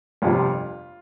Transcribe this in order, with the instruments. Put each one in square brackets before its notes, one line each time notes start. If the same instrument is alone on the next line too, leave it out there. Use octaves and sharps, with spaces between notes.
[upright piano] G1 F2 C3 F4